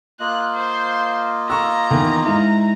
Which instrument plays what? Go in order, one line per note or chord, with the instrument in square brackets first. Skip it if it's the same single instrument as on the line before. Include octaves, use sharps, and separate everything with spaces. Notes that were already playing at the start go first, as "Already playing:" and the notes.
[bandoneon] A#3 F4 D#5 [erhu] F#6
[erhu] C5
[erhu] A#5 [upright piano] C#6 E6
[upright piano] E2 D#3
[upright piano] G#2 E4 [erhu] A#5